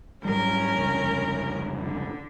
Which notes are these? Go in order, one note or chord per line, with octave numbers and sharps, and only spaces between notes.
G#2 F#3 G3 C#4 A#4
F1 C#2 G2
D3